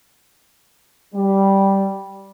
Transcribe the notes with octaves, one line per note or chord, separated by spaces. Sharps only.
G3